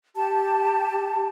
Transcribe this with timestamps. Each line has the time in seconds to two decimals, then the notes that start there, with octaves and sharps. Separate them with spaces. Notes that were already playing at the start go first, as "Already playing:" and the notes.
0.16 G4 A5